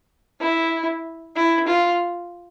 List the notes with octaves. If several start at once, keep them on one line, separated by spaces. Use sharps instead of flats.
E4
E4
F4